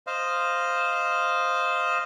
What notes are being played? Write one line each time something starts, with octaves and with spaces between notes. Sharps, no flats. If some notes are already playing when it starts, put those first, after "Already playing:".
C5 D#5 F5